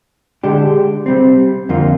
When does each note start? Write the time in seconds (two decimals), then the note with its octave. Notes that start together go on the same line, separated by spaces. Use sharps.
0.43 D3 G#3 D4 G4
1.06 C3 G3 C4
1.69 F2 D3 G3 A#3 F4